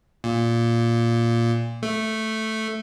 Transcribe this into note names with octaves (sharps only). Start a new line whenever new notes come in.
A#2
A3